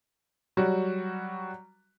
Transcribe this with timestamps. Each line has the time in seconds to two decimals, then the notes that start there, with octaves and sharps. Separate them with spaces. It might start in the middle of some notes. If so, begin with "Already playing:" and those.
0.57 F#3 G3 F#4